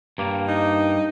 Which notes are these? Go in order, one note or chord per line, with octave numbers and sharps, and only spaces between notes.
G2 A#3
D#4